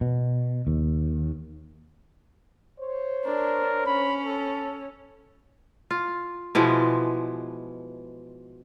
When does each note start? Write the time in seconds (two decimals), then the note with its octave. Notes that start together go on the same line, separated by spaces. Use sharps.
0.01 B2
0.67 D#2
2.80 C5 C#5
3.25 D4 A#4
3.86 C#4 B5
4.26 A4
5.91 F4
6.55 B2 E3 F3 G#3